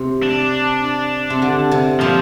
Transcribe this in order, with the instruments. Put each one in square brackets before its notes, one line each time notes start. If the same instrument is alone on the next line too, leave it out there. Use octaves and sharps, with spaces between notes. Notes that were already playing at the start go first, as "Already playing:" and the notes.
Already playing: [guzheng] C3
[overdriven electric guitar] D4
[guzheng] C3
D3
C3
[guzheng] A#2 [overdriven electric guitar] F3